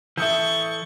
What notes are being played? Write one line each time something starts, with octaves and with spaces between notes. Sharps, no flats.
E3 A4 E5 C#6 D#6 G6